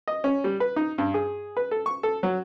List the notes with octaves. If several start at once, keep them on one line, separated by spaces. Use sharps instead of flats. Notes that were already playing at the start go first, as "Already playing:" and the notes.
D#5
C#4
G3
B4
D#4
G2
G#4
B4
A4
C#6
A4
F#3